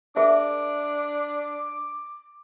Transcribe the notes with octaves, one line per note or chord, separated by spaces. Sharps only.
D4 G#4 A#4 E5 D6